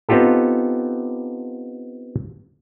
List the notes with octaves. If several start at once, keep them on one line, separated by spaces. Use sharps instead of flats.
B3 C4 D#4 F4 G4 A4